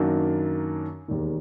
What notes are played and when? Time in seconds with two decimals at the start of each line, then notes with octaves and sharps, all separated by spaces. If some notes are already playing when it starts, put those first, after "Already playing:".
Already playing: F#2 D#3 F#3 A#3 D4
1.08 E1 D#2 D#3